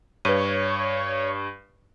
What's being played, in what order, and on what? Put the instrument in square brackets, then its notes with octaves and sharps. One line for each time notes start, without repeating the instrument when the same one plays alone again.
[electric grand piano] G2 [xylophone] B4 D#7 [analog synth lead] C#5